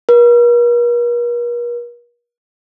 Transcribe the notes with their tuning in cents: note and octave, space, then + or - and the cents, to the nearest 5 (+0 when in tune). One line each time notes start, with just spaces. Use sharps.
A#4 +45